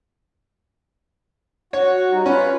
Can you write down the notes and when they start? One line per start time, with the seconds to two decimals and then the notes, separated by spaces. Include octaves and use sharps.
1.73 F#4 C#5
2.12 G3 D#4
2.26 C#4 F4 B4